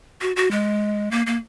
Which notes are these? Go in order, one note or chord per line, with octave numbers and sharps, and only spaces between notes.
F#4
F#4
G#3
A#3
A#3